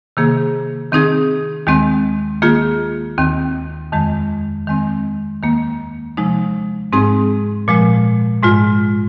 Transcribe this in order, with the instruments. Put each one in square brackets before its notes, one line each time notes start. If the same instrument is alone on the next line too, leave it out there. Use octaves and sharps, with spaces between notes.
[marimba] C3 D#3 A#3 G#4
D#3 C4 D#4 G#4
D#2 D#3 G#3 C4
D#3 A#3 F4 G#4
D#2 D#3 C4
F2 D#3 G#3
D#3 G#3 C4
D#2 D#3 A#3
C3 F3 G#3 D#4
G#2 G#3 C4 D#4 G#4
A#2 F3 G#3
G#2 G#3 F4